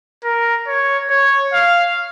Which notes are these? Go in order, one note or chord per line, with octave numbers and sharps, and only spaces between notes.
A#4
C#5
C#5
F5